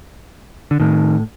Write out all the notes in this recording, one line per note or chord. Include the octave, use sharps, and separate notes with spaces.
D3
A2 D#3